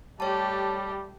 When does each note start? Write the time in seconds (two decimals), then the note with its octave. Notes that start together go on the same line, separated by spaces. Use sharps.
0.20 G3 A3 G4 C#5 A5